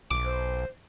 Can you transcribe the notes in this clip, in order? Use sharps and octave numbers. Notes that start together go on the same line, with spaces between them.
B1 D6
C5